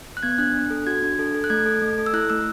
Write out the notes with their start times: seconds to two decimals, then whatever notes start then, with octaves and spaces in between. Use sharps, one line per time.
0.17 F#6
0.23 B3 G#6
0.38 D4 F#6
0.54 D4
0.70 A4
0.87 F#4 G#6
1.02 D4
1.19 A4
1.34 A4
1.44 F#6
1.50 A3 G#6
1.66 A4
1.82 A3
1.98 A4
2.06 E6
2.13 E4 F#6
2.30 A3 E6